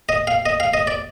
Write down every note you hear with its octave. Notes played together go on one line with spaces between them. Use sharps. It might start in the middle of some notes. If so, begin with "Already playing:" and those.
D#5
F5
D#5
F5
D#5
D5